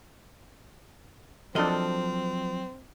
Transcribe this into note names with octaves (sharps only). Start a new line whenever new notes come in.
F3 F#3 C4 D4 A4 A#4 D#5